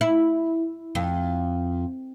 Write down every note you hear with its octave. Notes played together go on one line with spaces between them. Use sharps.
E4
F2